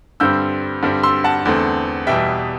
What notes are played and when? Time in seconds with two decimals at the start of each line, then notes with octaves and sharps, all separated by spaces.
0.20 G2 D3 G3 C4 E6 G6
0.83 G2 D3 G3 C4
1.03 C6 E6
1.24 F#5 A5
1.45 E2 D3 A3 C4
2.07 E2 B2 G3 E5 G5